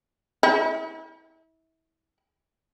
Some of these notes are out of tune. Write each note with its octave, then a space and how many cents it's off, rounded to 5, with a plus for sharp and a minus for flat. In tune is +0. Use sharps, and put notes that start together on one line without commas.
E4 -30